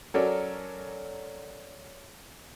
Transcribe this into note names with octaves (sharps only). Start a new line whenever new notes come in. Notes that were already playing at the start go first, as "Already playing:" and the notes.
F#3 C#4 A4 A#4 D5